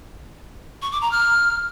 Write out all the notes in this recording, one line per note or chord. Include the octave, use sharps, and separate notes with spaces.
C#6
D6
A#5
F6